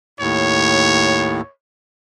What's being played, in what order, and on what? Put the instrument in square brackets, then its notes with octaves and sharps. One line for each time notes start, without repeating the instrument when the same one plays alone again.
[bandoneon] D#2 A2 [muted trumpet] C#5